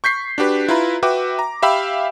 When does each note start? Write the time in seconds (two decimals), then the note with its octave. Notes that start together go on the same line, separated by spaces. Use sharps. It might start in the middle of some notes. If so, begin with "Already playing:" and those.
0.04 C#6 G6 B6 C7
0.38 D4 F#4 G4 B4
0.69 E4 F4 B4 A#5 B5
1.03 F#4 B4 E5 G5 D6
1.39 A#5
1.62 G4 E5 F5 G5 B5 E6